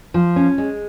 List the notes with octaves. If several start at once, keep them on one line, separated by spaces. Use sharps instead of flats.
F3
C#4
G#3